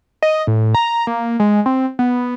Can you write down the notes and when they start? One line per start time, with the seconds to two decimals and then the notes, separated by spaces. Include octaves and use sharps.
0.23 D#5
0.47 A2
0.75 A#5
1.07 A#3
1.40 G#3
1.66 C4
1.99 B3